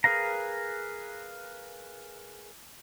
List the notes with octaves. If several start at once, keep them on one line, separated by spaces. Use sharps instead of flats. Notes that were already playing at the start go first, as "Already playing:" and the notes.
G#4 A#4 B4 F5 A#5